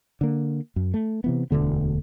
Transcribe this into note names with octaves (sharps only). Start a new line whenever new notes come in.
D3 A#3
F#2
A3
C3 E3 B3
E1 D2 D3 B3